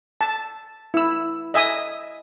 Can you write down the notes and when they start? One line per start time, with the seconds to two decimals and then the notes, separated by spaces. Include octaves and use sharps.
0.21 A5
0.94 E4 E6
1.54 D#5 E5 G#5 D#6